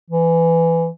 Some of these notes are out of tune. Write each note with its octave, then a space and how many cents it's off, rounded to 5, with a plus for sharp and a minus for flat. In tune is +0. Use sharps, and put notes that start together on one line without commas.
E3 +15